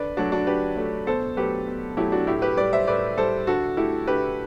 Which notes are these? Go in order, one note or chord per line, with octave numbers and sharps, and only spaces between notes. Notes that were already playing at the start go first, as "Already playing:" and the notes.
Already playing: D3 B4 D5
F#3 A3 D4 F#4
D4 F#4
D3 G4 B4
F#3 A3
B2 A4 C5
F#3 A3 G4 B4
B2
F#3 A3 E4 G4
D4 F#4
A2 E4 G4
G4 B4
G3 B4 D5
C5 E5
A2 B4 D5
G3 A4 C5
D3 F#4 A4
A3 E4 G4
D3 G4 B4